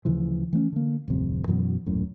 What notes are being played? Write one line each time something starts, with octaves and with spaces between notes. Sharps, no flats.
D2 C#3 E3 F3
E3 A3 B3 C#4
D3 A#3
D1 C2 F2 C3
F#2 B2 E3 F#3
D#1 F#2 A2